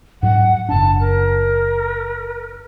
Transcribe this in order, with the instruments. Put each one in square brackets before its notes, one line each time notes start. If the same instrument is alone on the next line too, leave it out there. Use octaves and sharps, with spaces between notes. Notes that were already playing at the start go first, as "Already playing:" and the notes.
[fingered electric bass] G#2 F#3 [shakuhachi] F#5
[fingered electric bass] F#1 D4 [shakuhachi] A5
[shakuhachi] A#4